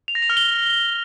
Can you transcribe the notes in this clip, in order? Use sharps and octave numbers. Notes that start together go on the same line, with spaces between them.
F7
A#6
F7
F6
G7